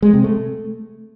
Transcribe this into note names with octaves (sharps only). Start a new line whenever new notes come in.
G#3
C3
A3